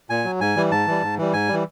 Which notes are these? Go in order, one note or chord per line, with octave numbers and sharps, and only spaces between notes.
A#2 G#5
F#3
G#2 G#5
E3 G3
G#2 A5
E3 G3
G#2
E3 G3
G#2 G#5
E3 G3